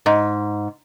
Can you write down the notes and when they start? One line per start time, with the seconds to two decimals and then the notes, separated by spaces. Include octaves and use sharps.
0.06 G#2